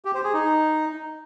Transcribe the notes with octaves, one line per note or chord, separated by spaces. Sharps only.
G4
C5
G#4
D#4